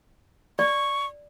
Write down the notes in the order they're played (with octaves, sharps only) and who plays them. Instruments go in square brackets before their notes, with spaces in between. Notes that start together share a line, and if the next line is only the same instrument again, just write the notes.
[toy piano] D5 [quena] C#6